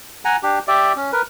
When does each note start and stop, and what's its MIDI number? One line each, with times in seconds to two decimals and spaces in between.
0.25 0.36 78
0.25 0.36 80
0.25 0.36 82
0.43 0.59 62
0.43 0.59 67
0.68 0.93 67
0.68 0.93 74
0.68 0.93 76
0.96 1.11 61
1.12 1.22 70
1.12 1.22 71